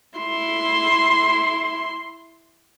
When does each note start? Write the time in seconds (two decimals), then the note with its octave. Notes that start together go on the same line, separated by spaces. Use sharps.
0.19 E4 C6